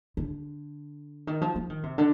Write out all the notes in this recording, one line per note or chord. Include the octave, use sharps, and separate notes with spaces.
D3
D#3
F3
F3
D#3
C3
D3